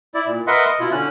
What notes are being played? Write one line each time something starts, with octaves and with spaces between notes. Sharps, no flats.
E4 D5
A#2
A#4 B4 D#5 E5 F#5 C6
D#5
B2 E4 F4
D3 C#4 F#6